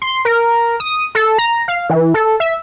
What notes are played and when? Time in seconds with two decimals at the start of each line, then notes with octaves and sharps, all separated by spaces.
0.02 C6
0.25 A#4
0.80 D#6
1.15 A4
1.38 A#5
1.68 F5
1.90 E3
2.14 A4
2.40 E5